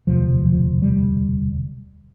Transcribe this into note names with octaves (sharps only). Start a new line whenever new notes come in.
E1 D2 C3 F3
F3
G3